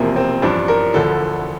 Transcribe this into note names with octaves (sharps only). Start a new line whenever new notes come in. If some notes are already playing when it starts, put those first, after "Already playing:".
Already playing: E1 E2 C3 F3 A#3
C4
A1 G2 F3 D4
A#4
E1 D2 D3 F3 A4